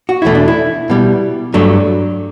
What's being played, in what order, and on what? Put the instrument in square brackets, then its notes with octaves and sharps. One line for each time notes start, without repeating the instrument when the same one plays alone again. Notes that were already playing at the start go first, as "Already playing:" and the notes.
[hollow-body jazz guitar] F#4
E2 B2 A3 E4
D4
E4
B2 G3
G2 F#3 A3 D4